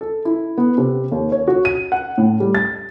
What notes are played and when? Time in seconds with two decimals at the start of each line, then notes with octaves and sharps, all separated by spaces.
0.01 A4
0.25 E4
0.58 B3
0.78 C3
1.12 D#2
1.32 C#5
1.48 F#4
1.65 D#7
1.92 F#5
2.18 A2
2.40 G3
2.55 A6